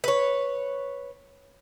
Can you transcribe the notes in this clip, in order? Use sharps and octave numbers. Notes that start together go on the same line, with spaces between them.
B4 C#5